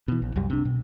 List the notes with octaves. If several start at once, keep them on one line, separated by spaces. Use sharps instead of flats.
B2 E3
A#1
C2 F#2 G3
C3 D4
B2